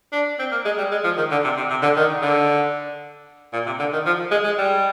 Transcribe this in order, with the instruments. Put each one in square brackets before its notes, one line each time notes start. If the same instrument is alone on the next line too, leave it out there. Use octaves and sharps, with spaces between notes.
[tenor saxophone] D4
C4
A#3
G#3
G3
G#3
F3
D#3
D3
C3
C3
C3
D3
D#3
D3
A#2
C3
D3
D#3
F3
G#3
G#3
G3